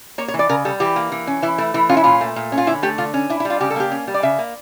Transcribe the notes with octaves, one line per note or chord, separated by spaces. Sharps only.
A#3 C#5
C#5
E3
D5
C#3 A#4
G3 A4
E3 G4
A#3
E3
C#4
E3 E4
A3 E4
E3 E4
C#4 F4
E4
A#2 F4
A3
A#2
C#4
F4
D3 E4
A3 G4
D3 F4
C#4
D4 E4
E4
G3
F4
C#3 G4
A4
A#3 G4
C#4
G3
D5
C#3 E5
A#3